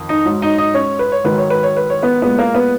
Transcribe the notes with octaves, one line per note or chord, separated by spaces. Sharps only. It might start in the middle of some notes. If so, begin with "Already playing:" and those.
Already playing: F2 D#3
D#4
G#2 F#3
D#4 D#5
D#4 D#5
C#4 C#5
B4
C#5
G#2 D#3 F#3 B4
C#5
B4
C#5
B4
C#5
B3 B4
A#2 G#3 B3 B4
A#3 A#4
B3 B4